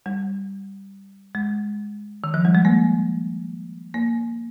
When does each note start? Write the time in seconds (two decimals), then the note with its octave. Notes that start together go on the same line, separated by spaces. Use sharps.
0.06 G3
1.35 G#3
2.24 D#3
2.34 F3
2.45 G3
2.55 G#3
2.65 A#3
3.94 A#3